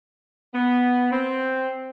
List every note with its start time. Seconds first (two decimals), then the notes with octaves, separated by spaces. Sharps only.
0.55 B3
1.12 C4